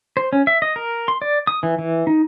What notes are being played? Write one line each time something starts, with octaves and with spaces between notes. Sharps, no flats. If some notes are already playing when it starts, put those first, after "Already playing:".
C5
C#4
E5
D#5
A#4
C6
D5
D#6
E3
E3
D#4